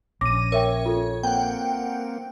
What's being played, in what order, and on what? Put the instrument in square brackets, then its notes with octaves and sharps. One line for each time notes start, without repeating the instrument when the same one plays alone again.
[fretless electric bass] A#1 [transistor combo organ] C#4 [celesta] D6 [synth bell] A#6 D#7
[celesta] A#4 E5 G5 [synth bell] C#5
[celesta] F4 A4
[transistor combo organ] A#3 C4 [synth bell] F#5 G5